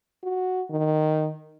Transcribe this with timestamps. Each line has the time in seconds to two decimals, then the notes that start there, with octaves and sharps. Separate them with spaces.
0.24 F#4
0.70 D#3